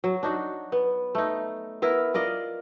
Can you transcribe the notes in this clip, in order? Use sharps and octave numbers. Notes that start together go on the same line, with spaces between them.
F#3
D4 D#4 F#4
B3
A3 D#4
B3 E4 A#4
F4 A#4 D5 D#5